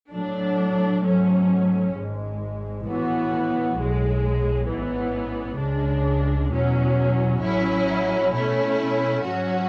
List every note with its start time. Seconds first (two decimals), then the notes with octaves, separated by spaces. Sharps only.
0.10 A2 F#3 A3 D4
1.02 G#2 F#3 A3 C#4
1.94 G#1 G#2 G#3
2.84 A2 E3 B3 F#4
3.76 B1 A2 G#3
4.67 A1 G#2 E3 B3
5.58 C#2 C#3 G#3 D4
6.50 E2 B2 F#3 C#4
7.41 A1 A2 F#3 C#4 E4
8.32 B2 A3 C#4 E4
9.23 G#2 F#3 C#4 F#4